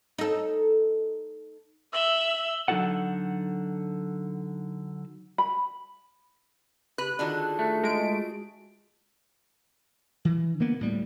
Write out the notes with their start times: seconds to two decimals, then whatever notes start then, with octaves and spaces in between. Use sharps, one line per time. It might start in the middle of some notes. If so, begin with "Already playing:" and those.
0.18 D#4 A4
1.93 E5 E6 F#7 G7
2.68 D3 F#3 D#4 F#4 A4 F#5
5.38 B5
6.98 C#3 G4 B4 F#6
7.19 D3 D#3 D4 F4 F#4 G#4
7.59 A3
7.83 G#3 D7
10.25 E3
10.60 D3 A#3 B3
10.79 D2 A2 G3